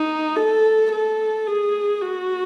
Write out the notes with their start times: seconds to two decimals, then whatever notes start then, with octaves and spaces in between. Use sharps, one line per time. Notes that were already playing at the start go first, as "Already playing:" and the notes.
Already playing: D#4
0.36 A4
0.92 A4
1.47 G#4
2.01 F#4